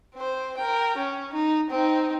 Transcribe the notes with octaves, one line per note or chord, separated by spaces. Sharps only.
C4 C5
A#4 G5
C#4
D#4
C4 D#4